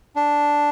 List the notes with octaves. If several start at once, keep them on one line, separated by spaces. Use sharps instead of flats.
D4